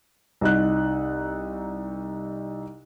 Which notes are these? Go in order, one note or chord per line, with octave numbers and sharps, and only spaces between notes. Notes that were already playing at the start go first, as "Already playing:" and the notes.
C2 D#4 F#6